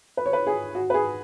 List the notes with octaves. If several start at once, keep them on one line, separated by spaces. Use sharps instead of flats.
B4
C#5
B4
G#4
F#4
B4
G#4